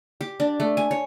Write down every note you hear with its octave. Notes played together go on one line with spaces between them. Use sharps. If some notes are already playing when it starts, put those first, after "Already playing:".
G4
D4
A3
G#5
C#5